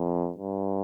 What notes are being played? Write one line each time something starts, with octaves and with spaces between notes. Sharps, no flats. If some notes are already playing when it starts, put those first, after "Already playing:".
Already playing: F2
G2